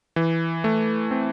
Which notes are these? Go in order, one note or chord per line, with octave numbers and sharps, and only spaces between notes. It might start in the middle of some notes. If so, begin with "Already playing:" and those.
E3
A3
C4